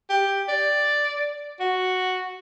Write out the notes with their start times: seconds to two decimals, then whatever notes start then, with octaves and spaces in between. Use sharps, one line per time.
0.09 G4
0.48 D5
1.60 F#4